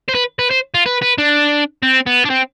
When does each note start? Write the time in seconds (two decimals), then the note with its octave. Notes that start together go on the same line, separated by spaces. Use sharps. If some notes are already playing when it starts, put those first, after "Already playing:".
0.09 C5
0.15 B4
0.39 B4
0.50 C5
0.74 F4
0.86 B4
1.02 B4
1.18 D4
1.82 C4
2.06 B3
2.25 D4
2.30 C4